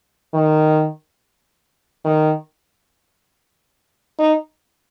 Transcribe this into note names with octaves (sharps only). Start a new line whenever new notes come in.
D#3
D#3
D#4